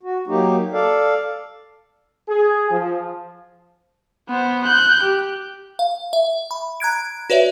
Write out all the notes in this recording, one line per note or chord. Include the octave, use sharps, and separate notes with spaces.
F#4
F#3 A#3 D#4 G4
A4 D5 F5
G#4
F3
B3 C5
F#6 G6
G4
F5
E5
B5
A#5 F#6 G#6 D7
F#4 B4 C#5 D5 E5